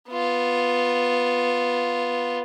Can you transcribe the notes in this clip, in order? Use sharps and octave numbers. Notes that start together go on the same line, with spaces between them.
B3 F4